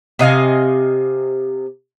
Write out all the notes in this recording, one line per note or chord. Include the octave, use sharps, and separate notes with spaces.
C3 D#5 F5 G#5